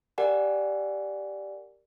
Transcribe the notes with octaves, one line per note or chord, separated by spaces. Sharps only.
G4 A#4 D5 F#5 G#5